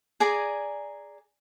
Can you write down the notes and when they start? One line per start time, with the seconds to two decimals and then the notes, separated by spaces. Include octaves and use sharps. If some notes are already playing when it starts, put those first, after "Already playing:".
0.20 G#4 D5 G#5 A#5